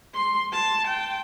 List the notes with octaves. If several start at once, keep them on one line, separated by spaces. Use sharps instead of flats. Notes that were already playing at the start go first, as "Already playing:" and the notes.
C6
A5
G5